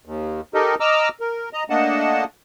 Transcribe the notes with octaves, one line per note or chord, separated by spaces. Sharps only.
D#2
D#4 G4 A4 A#4 D#5
D#5 A#5 D6 E6 F6
A#4
D#5 A#5
A3 A#3 D4 D#5 F#5 A5